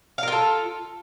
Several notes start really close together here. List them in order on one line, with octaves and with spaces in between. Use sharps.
F5 A#4 F4 A4